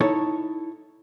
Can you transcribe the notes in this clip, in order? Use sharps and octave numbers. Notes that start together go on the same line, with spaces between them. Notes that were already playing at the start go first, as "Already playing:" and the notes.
D#4 E4 A4 C#5